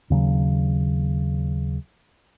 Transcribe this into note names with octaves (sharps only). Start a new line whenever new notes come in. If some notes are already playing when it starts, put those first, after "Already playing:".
D#2 C#3 F#3